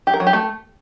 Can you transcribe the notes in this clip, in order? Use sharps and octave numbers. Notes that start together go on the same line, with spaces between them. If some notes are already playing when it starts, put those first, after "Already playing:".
G4
A#4
F#3
G4
A3